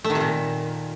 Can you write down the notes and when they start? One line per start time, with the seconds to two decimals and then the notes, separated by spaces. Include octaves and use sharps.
0.04 A3
0.10 D#3
0.15 C3
0.20 A#2